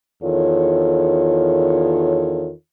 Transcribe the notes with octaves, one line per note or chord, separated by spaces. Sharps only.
E2 D#3 F4 A4 C#5